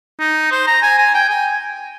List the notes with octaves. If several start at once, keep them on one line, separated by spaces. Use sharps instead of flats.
D#4
C5
A#5
G#5
G#5
G5
G#5